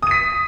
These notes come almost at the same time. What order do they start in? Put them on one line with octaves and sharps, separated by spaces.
D#6 D#7 B6